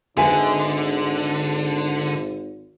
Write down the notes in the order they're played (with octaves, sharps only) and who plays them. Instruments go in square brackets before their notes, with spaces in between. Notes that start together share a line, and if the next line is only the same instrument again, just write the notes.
[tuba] G#1 [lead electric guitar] D3 [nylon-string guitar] G#4 B4 D#5 [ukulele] E5 G#5